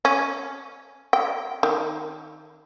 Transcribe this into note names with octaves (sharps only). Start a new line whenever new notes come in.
C#4
G5
D#3